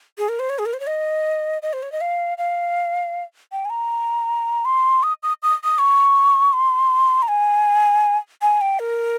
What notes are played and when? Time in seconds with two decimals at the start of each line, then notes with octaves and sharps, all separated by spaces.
0.18 G#4
0.29 A#4
0.39 C5
0.49 C#5
0.59 G#4
0.66 A#4
0.73 C5
0.80 C#5
0.87 D#5
1.62 D#5
1.73 C5
1.82 C#5
1.92 D#5
2.01 F5
2.38 F5
3.52 G5
3.65 G#5
3.70 A#5
4.65 C6
5.03 D#6
5.23 D#6
5.43 D#6
5.64 D#6
5.78 C#6
6.53 C6
7.22 A#5
7.28 G#5
8.42 G#5
8.61 G5
8.79 A#4